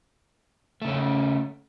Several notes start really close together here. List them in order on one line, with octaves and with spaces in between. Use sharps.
A3 C#3 C#4